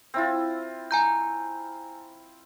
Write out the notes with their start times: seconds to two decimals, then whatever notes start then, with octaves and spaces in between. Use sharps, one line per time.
0.14 C4 E4 F4
0.91 G#5 A#5 G6